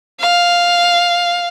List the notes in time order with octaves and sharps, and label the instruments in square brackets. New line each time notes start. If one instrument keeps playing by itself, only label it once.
[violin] F5